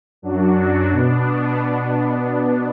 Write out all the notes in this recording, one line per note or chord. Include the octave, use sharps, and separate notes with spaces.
F#2 F#3 D4 F#4
B2 B3 D4